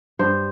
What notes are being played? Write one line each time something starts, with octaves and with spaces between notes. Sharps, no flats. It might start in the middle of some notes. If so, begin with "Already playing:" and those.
G2 C5